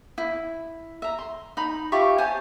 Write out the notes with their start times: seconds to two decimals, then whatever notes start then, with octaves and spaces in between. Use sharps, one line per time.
0.18 E4
1.02 E5 A#5
1.19 C6
1.57 D#4 B5
1.92 F4 G4 E5 C#6
2.18 C5 C#5 G#5 A5